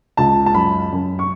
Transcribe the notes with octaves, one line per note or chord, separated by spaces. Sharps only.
C#2 A5
A5
F#2 B5
F#2
C#6